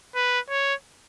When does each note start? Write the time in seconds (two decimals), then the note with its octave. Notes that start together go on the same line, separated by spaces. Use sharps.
0.15 B4
0.50 C#5